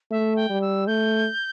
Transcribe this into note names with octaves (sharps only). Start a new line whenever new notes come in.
A3 E5
G5
G3
E6
A3 G6